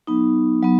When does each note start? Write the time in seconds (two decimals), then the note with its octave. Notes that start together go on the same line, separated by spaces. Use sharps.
0.07 F#3 B3 D#4
0.63 F#3 B3